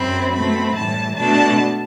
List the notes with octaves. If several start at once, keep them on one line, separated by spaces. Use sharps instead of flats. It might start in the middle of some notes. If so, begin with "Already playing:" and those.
Already playing: F#2 F#3 C4 B5
B2 A3 C4 B5
A2 E3 G3 A5
B2 A3 D4 A5